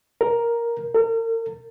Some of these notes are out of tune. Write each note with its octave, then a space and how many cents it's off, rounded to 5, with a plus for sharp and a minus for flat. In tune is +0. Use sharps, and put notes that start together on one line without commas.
A#4 +5
A#4 -40